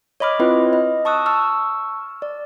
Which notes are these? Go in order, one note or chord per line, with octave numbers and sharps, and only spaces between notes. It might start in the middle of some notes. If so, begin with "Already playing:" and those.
C#5 D#5 B5 D6 F6
C4 E4 F4 B4 D#5
D#5
A5 C#6 D#6 E6 F#6
A5 C#6 E6 F6
D5